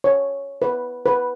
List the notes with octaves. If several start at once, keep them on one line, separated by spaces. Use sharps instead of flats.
C#5
B4
B4